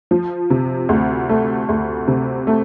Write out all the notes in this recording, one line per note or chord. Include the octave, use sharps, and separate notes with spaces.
F3
C3
D2
A3
D2
C3
A3